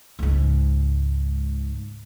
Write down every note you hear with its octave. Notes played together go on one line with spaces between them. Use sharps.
C#2 G#2